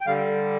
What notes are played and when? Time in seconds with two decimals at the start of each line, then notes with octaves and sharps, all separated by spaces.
0.01 G5
0.07 D3 G3 F5